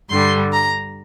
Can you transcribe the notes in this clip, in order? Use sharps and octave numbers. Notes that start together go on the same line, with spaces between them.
G2 D3 G3 C6
A#5